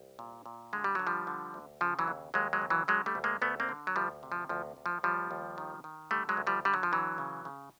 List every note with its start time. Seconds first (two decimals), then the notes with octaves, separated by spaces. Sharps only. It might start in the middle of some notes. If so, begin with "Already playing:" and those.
Already playing: C2
0.19 A#2
0.46 A#2
0.73 D3 G#3
0.84 G3
0.95 D3 F#3
1.07 F3 G3
1.27 D3
1.54 D2
1.81 C#3 F3
1.99 E3 F#3
2.08 D#2
2.34 D#2 F#3 G#3
2.53 F#3 G#3
2.61 C#3
2.70 E3 F#3
2.88 D3 F#3 G#3
3.06 G3 A3
3.15 D2
3.24 G#3 A#3
3.41 D2 A3 B3
3.60 A#3 C4
3.69 D3
3.87 F#3
3.96 D2 F3 G3
4.23 C3
4.32 F3
4.49 D2 F3
4.77 D2
4.86 F3
5.03 D#2 F3 G3
5.31 D#2
5.58 D#3
5.84 D#3
6.11 D3 G3 A3
6.29 F#3 G#3
6.37 D2
6.47 F3 G3
6.65 D3 G3
6.74 F#3
6.83 F3
6.92 D3 E3 F#3
7.18 C#3
7.45 C#3